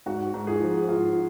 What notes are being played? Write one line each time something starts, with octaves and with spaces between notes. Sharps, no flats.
G#2 F#4
G#2
F4 G#4
F3
G#2 F4